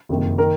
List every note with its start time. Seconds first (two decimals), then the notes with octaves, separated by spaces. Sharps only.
0.09 F#1 F2 C3 D#3
0.38 D#3 A#4